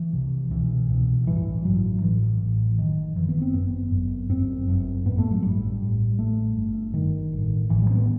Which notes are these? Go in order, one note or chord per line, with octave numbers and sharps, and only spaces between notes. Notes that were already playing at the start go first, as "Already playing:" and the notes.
Already playing: E3
C2 C3
C2 B2 E3
C2 B2
A1 G2 E3
A1 G2 F#3
A1 A2 E3
A1 A2
F#1 F#2 D#3
F#1 F#2 E3
B3
C4
G1 F#2 B3
G1 F#2
G1 F#2 C4
G1 F#2
A1 G2 B3
A3
F#3
A1 G2 G3
A1 A2
A1 A2 A3
G1 G2
G1 G2 D#3
A1 A2
A1 A2 E3
G3
C4
B3